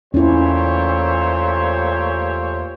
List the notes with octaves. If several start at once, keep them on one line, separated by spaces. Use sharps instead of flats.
E2 A#2 A3 C#4 E4 G4 C5 C#5